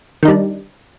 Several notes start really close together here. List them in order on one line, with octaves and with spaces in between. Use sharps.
D#3 D#4 G3 D4